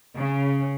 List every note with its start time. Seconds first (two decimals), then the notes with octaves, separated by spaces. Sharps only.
0.15 C#3